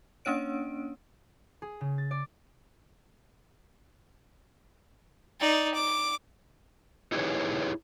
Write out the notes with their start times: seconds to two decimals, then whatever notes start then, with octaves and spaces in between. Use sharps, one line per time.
0.25 A#3 C#4 D4 C#5 D7
1.62 G#4
1.81 C#3
1.98 A6
2.11 D5
5.40 D#4 D5
5.74 D6
7.12 D#4 E4 G4 G#4 B4 C#5